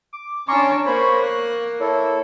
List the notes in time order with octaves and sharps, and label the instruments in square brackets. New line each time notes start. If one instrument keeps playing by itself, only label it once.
[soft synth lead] D6
[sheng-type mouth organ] C#4 A#5 C6 [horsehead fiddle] D4 C#5 [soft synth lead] C#6
[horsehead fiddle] A#3 [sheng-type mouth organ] C5 C#5 B5
[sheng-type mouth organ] F#6
[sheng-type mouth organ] E4 A4 [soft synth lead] C#5